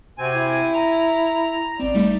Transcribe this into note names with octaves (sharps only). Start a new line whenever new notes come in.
C3 C4 F#4 G#5
E4
A#5
G#1 C4 D5
G3 A3 D#4